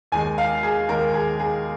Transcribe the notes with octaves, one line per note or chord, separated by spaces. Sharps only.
D#2 D#3 G#3 G#5
F5
G#4
D#2 D#3 G#3 A#4
G#4
G#4